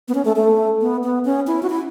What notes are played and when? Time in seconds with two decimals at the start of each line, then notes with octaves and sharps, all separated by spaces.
0.08 B3
0.15 C#4
0.25 A3
0.36 A3
0.81 B3
1.04 B3
1.25 C#4
1.47 E4
1.63 F#4
1.70 E4